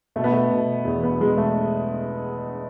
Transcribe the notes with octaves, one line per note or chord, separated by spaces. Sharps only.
B2 A3
B3
A3
B2
E2
B3
B2 G#3
A3